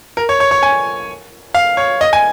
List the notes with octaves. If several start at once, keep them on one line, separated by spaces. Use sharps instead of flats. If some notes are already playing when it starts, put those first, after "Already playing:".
A#4
C#5
C#5
C#5
G#5
F5
C#5
D#5
G#5